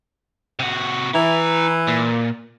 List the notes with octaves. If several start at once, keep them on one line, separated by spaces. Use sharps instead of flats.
C3 F#4
E3 E4 A#5
A#2